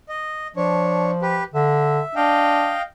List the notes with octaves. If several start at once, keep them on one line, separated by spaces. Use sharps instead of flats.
D#5
F3 D4 C#5
G4 B4
D3 E5
D4 D#5 F5 G5